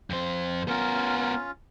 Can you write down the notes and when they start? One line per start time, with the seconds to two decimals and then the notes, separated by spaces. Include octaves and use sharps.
0.10 F2 C5
0.68 B3 C#4 F4 A#4